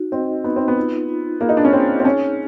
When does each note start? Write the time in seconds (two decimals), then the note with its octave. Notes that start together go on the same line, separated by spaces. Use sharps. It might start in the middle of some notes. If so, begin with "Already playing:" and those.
Already playing: D#4 F#4
0.12 C4 D#5
0.44 B3 D#4
0.56 C4
0.68 B3
0.76 F4
1.08 F4
1.41 A#3 G#4
1.49 D#4
1.57 D4
1.65 C#4
1.73 C4 G#4
2.00 C4
2.05 C#4 D#4